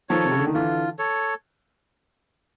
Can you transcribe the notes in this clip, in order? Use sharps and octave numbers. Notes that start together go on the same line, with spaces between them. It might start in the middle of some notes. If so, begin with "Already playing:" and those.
D#3 F3 A4 C#5
C3
C#3
D3
D#3
D3 E3 F4
A4 C#5